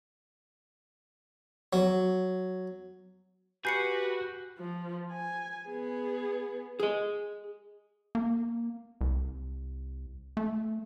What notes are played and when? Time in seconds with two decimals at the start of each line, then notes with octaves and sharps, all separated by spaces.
1.73 F#3
3.65 F#4 G4 B4 G#5 G6 C7 C#7
4.59 F3
5.12 G#5
5.69 B3 G#4
6.80 G#4 D#5
8.15 A#3
9.01 C2
10.37 A3